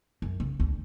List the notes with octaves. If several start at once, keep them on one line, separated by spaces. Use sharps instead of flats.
F#2
C#3
D2